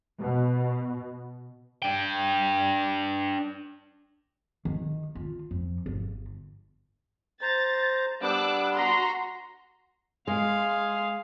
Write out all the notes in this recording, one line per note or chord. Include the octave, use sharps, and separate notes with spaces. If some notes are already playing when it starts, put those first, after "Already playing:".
B2
D4 G5
D#3
F4
F2
G1
C5 A#5 A6
G3 B3 D4 D6 E6 F#6
F#4 A#5 C6
G#3 G#4 F5 G#5 C6